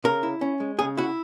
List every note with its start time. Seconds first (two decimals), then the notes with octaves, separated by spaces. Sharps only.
0.04 C#3 A#4
0.23 E4
0.41 C#4
0.60 G#3
0.79 C#3 G#4
0.97 E4 F#4